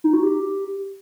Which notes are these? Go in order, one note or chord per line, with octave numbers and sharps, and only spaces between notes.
D#4
F#4
G4